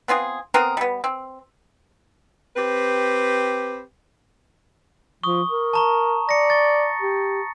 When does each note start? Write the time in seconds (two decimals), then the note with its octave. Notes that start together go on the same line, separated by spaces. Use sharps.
0.08 B3 C4 F4 G#4
0.54 B3 C4 G#4 A#4
0.77 G3 B3
1.04 C4
2.57 C4 G4 B4
5.24 F3 C#6 D#6
5.50 A#4
5.73 A5 A#5 C#6
6.29 D5 A#6 C#7
6.50 C#6 A6
7.01 G4